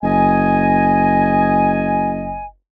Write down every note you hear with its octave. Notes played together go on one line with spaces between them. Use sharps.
F#1 D#5 G#5